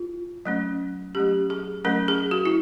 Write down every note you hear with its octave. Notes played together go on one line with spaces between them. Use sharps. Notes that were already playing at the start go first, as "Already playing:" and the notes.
Already playing: F4
F#3 A3 C#4
F#3 A3 C#4 G4
G#4
F#3 A3 C#4 A#4
G#4
F#4
E4